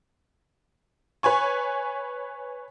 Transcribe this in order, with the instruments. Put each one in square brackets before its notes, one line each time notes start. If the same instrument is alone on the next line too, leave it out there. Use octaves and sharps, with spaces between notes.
[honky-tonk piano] B4 C#5 G#5 C#6